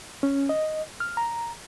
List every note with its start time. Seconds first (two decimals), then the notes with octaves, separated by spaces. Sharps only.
0.23 C#4
0.49 D#5
1.00 F6
1.17 A#5